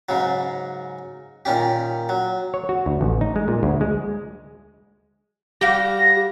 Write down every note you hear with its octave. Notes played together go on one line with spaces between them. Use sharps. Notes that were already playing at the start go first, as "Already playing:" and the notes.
G#2 C#3 F#3
A#2 D#3 C#4 G4
F#3
C#5
F#4
D2
A1
D#4
G#3
A#2
D2
G#3
G3 F#4 G4 F5 A#6